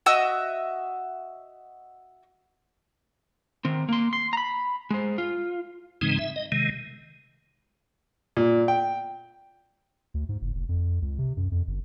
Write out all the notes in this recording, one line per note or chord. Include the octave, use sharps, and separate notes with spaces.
F#4 D#5 E5 E6
D#3 C4
A#3 C6
C6
A#5 B5
G#3 C5
F4
G#2 C#3 E3 G#3 C4 D#4
E5
D#5
C3 D#3 G#3
A#2
G5
D2
G#2
F#1
F1
F2
C#2
C3
F#2
F2
G1